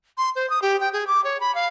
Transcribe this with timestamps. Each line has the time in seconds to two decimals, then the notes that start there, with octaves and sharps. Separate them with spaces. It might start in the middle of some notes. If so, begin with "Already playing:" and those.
0.18 C6
0.36 C5
0.50 D#6
0.62 G4
0.80 G5
0.93 G#4
1.07 D6
1.24 C#5
1.40 B5
1.55 F5